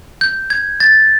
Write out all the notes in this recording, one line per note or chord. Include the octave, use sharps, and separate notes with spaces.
G6
G#6
A6